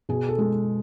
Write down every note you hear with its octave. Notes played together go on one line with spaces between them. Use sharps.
B2 G#4
A4
G#3